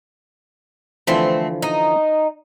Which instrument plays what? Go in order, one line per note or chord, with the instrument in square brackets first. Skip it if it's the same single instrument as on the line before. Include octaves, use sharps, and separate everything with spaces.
[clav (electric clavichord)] D3 E3 F3 [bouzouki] A3 C4
[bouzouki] D#4